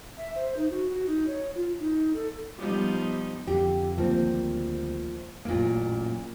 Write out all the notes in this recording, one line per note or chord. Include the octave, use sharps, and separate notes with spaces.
E5
C5
D#4
F#4
F#4
D#4
C#5
F4
D#4
A4
F3 G3 B3 D#4
F2 D3 G4
D2 D#3 F3 G3 A#3 C4
A1 F#2 A#2 A#3